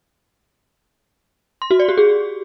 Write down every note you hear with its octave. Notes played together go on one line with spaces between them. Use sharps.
C6
F#4
D5
G4
G#4